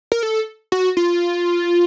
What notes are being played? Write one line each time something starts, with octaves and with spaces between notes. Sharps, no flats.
A#4
A4
F#4
F4